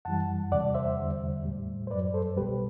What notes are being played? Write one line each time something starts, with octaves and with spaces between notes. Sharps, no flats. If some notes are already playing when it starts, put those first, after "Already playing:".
F#2 E3 G3 F#5 A5
E2 C3 G3 D5 F#5
C5 E5
E2 D3 G3
A2 G3
C5
F#2 F#3 B4 D5
A4 C5
C2 B2 G3 G4 B4